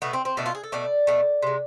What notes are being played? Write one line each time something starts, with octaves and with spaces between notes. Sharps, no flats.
B2 A3 B3
C4
C4
B2 A3 D4
F4
G#4
A4
B2 A3 D5
B2 A3
C3 G#3